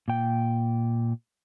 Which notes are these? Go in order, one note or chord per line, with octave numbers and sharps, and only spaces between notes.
A#2 G5